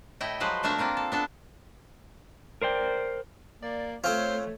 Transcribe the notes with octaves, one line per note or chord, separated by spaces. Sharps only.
A2 E4 D#5 G5
F3 F#3 G#3 B4 C5
B2 A3 D4 E5 F5 A#5
A#3 C4 F4 A#4
A4
B3 D4 A4
A#4 C5 D5 G5
A#3 D5
A3 C4 F4 C5 C#5